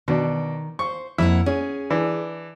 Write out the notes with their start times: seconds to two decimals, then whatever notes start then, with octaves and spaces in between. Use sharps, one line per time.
0.08 B2 D#3 D4
0.79 C5 C#6
1.18 F2 A#3 E4 F#5
1.46 C#4 G#4
1.90 E3 D4